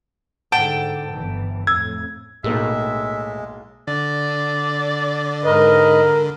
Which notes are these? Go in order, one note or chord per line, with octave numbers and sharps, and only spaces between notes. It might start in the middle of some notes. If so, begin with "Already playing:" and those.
G#2 D3 F#5 G5 A5
G1 E3
F2 A2 E6 G#6
B1 A2 G#3 A#3 G#4 E5
D3 D5
G#2 A#4 B4 D#5